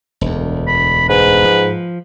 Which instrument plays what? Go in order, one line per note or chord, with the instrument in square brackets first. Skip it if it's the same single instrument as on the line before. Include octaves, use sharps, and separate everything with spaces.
[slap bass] E1 D2
[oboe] B5
[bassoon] G#2 [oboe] B4
[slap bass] F3